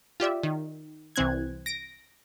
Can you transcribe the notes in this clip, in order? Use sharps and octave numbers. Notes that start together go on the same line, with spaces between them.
F4 G4 D5 E5
D#3
C2 E3 C4 F#6 G#6
A#6 D7